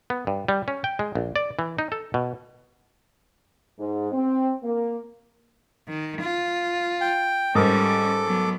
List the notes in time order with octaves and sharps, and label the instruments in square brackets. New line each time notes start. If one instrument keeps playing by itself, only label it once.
[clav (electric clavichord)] B3
G2
G3
C#4
G5
G#3
A#1
D5
E3
D#4
A4
B2
[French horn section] G#2
C4
A#3
[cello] D#3
F4
[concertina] G5
[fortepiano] G#2 A#4 D#6 [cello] G3 C#4 [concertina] A4 D6
[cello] F#3 B3